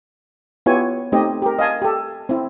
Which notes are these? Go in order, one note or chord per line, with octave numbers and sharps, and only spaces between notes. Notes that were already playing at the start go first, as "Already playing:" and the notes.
B3 E4 F4 G4 C#5 G#5
A3 C4 D#4 G4 D#5
G4 A#4
D#5 F5 G#5 A5
G4 A4
C4 E4